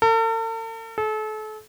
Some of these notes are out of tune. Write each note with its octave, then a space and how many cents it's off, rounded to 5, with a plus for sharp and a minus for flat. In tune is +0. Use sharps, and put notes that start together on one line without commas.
A4 +45
A4 -35